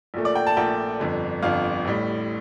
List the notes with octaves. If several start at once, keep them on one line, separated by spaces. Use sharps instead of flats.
A#1 A#2 A3
D5
G5
A5
A#1 A#2 A3 G5
G1 F2 D3
G1 F2 D3 F5
A1 A2 G3